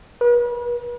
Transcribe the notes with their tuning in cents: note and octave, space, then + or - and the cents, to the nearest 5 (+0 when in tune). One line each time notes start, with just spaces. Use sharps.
B4 -40